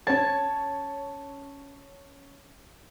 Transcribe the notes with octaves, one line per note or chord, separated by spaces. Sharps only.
C#4 C#5 A5 G#6